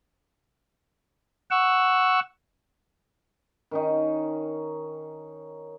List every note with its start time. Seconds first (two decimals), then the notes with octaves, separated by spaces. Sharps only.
1.51 F#5 C#6 E6
3.71 D#3 C#4 D#4